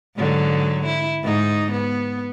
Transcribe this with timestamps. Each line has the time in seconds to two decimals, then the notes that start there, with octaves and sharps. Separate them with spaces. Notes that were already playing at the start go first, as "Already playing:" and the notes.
0.16 G#2 D3 F#3
0.85 E4
1.22 G#2 D#4
1.71 B3